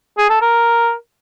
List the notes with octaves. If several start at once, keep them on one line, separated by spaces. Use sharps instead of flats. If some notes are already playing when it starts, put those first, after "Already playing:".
G#4
A4
A#4